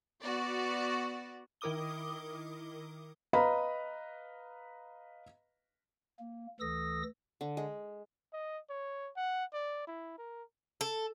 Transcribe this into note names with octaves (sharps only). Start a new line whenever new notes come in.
B3 F#4 D5
D#3 E4 A#4 D6 D#6 G7
B4 D#5 F5 A#5 B5
A#3
D2 E3 A4 D#6 E6 A#6
D3
G#3
D#5
C#5
F#5
D5
E4
A#4
A4